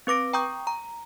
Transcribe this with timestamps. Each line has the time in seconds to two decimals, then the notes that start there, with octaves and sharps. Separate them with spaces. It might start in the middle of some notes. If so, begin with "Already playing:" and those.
0.07 C4 B4 D6 A#6 D7
0.33 G5 A#5 C#6 D#6 G6
0.67 A#5